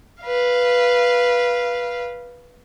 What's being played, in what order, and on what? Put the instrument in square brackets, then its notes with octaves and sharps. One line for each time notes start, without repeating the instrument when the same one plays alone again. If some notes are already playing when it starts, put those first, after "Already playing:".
[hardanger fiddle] B4 F5